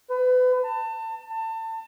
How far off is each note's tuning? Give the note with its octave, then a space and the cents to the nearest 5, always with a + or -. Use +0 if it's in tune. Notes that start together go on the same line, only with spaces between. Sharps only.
B4 +35
A5 +30
A5 +30